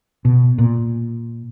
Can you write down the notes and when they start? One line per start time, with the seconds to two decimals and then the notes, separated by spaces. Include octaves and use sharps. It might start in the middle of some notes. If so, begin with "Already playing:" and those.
0.25 B2
0.58 A#2